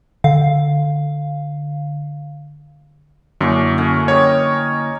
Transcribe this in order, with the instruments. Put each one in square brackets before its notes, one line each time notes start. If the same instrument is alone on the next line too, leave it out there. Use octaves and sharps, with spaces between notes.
[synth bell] D3 F5
[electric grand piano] F#2 [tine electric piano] D3 A#3 E4 [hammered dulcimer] C#4 D4 F#4
[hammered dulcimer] A3 C#4 F#5
[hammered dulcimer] G4 A#4 D#5 [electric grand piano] C#5